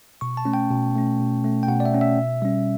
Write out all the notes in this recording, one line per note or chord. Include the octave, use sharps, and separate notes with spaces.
B2 C#6
A5
A3 C#4
G5
B2
A3 C#4
B2
A3 C#4
G5
B2 F#5
D5
E5
A3 C#4
E5
B2
G3 C#4